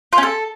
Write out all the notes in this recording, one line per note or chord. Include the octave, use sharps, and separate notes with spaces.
F4
C#4
A4